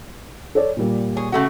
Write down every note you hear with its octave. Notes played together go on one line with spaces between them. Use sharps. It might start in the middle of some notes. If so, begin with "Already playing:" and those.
A4 C#5 D5
A#2 G3 A#3
G#4 C#5
C#3 A3 F#4